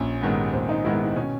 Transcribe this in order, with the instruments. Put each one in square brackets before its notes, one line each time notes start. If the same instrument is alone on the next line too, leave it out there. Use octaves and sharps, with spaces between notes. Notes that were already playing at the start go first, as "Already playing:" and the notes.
Already playing: [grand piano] A#1 [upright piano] C#4
[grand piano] G#2 D#3 G#3 B3
[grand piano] A#1 [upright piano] C4
[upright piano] D#4
[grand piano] G#2 D#3 G#3 B3 [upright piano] E4
[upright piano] D#4
[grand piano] B2 [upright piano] C#4